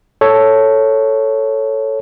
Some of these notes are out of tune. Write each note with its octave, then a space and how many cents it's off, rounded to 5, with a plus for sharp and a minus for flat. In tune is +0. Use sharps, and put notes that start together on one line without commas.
A4 +0 C#5 +0